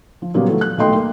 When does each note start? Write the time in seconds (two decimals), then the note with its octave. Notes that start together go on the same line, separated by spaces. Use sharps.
0.22 F3
0.34 A#2 C#3 F#3 G3 A#3 B3
0.48 E3 F#3 A3
0.61 F#6
0.77 D#1 B1 A3 D#5 G5 C6
0.95 A#3